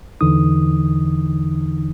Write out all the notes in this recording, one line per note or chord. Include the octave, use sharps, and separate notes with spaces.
E2 D3 E3 D#4 D#6